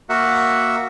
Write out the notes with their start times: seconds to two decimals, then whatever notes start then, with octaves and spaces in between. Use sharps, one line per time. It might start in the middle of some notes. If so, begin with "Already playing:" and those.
0.09 A#3 F#4 E5 F#5